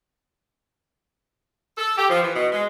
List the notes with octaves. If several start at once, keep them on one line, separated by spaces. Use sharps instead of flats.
A4
G4
F3
E3
B2
G#3